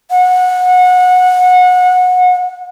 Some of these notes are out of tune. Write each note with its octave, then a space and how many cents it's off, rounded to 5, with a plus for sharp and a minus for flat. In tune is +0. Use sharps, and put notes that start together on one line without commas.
F#5 -25